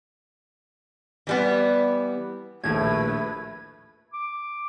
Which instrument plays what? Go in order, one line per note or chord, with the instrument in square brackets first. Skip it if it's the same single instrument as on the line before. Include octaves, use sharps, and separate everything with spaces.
[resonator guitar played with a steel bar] E3 G3 B3
[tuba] A#1 [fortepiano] D#2 A2 [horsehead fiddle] A3 B4 [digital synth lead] G#6
[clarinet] D6